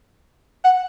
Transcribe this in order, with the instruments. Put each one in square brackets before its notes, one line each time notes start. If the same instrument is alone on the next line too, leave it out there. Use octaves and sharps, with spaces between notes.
[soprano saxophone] F#5